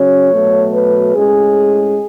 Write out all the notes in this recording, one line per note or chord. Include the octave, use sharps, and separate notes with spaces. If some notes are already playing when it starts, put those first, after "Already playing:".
Already playing: C#3 F#3 C#4 C#5
B2 F#3 A3
B4
A2 G#3 C#4 G#4